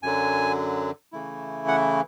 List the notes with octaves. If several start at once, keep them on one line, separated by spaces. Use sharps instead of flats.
F#2 D3 F#3 G#5
C#3 E3 A3 E4
F#5